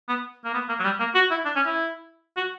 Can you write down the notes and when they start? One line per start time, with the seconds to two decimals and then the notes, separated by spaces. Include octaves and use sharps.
0.08 B3
0.45 A#3
0.54 B3
0.69 A#3
0.79 F#3
0.84 G3
0.99 A#3
1.15 F#4
1.31 E4
1.45 D4
1.56 C#4
1.66 E4
2.37 F#4